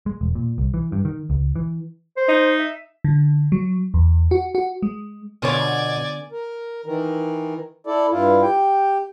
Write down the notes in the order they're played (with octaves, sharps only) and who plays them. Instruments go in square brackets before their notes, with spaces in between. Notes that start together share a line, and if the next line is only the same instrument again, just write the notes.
[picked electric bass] G#3
E1
A#2
C2
E3
G2
D#3
C#2
E3
[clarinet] C5
[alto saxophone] D#4
[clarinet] E5
[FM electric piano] D3
F#3
E2
F#4
F#4
G#3
[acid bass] B2 [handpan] D3 B3 [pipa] F4 C#5 [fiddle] D5 G#5
[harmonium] A#4
D#3 E3 A#4
E4 A4 D5
G2 E4 F4
G4 G5